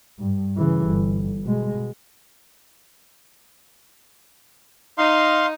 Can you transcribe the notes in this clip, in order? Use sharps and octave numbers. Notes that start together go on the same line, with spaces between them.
G2
C#3 E3
G1
B2 G#3
D#4 F5 C6